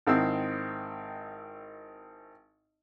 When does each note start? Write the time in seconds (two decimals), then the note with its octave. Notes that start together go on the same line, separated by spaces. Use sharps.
0.07 G#1 D#3 C4 E4 E6